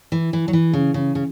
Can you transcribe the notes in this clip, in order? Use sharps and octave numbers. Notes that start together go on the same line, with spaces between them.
E3
E3
F#3
E3
C#3
C#3
C#3